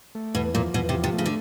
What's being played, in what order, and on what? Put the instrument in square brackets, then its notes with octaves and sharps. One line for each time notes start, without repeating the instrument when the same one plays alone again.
[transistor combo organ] A3
[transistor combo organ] E2 [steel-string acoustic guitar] B2
[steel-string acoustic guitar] A#2 [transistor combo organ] F3
[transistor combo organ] E2 [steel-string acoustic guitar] B2
[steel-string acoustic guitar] C3
[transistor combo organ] F3
[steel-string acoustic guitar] C3
[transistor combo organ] A3
[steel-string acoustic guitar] C#3
D3